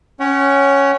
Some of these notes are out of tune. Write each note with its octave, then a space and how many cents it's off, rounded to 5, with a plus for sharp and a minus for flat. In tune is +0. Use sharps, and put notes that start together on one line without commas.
C#4 +0 C#5 +0 F#5 +35